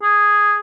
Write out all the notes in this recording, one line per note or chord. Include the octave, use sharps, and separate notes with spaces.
G#4